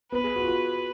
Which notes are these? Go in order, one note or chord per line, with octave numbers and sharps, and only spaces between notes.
B3 B4
G#4
F#4
F4
F#4